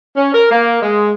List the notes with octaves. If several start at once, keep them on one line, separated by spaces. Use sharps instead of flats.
C#4
A#4
A#3
G#3